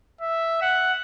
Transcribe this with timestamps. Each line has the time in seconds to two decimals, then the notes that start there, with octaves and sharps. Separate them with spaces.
0.21 E5
0.62 F#5